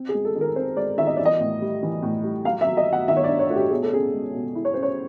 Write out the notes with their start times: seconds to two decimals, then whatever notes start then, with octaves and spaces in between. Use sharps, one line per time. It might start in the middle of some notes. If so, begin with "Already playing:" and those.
Already playing: C4
0.09 G#4
0.14 G#3
0.25 A4
0.35 D#3
0.41 A#4
0.56 C4 C5
0.77 G#3 D5
0.98 D#3 E5
1.07 D#5
1.17 E3 D5
1.25 D#5
1.40 A2
1.62 G3
1.83 E3
2.02 A2
2.23 G3
2.45 F#3 F5
2.61 E5
2.67 F#3
2.77 D#5
2.86 F#3
2.93 F#5
3.08 D#3 E5
3.17 C#5
3.24 D5
3.28 D4
3.39 C#5
3.49 A3 F#4
3.56 G4
3.71 B2 G#4
3.82 A4
3.93 C#4 G#4
4.13 G#3
4.34 B2
4.55 E4
4.65 C#5
4.74 C#4 C5
4.83 C#5